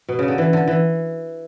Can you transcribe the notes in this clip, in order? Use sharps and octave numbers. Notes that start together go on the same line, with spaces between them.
B2
C#3
D3
E3
D3
E3